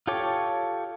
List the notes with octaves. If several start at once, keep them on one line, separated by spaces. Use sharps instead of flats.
F4 G4 A4 C#5 D6